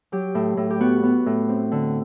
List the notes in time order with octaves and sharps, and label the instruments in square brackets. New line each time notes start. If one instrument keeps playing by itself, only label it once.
[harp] F#3 G4
A2
A2
G4
B3 F#4
B3
A2
C4
D3